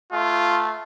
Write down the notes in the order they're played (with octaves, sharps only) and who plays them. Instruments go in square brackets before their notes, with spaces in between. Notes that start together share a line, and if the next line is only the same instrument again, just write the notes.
[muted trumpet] A3 [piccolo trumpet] F4